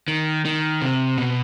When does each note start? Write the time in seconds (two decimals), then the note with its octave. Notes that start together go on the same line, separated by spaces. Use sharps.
0.08 D#3
0.45 D#3
0.82 C3
1.18 B2